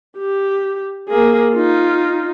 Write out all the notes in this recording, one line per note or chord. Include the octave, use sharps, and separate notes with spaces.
G4
A#3 G#4
D#4 F4